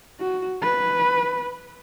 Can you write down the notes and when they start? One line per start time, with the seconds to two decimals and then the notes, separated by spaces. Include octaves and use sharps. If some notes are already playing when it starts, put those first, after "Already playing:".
0.20 F#4
0.62 B4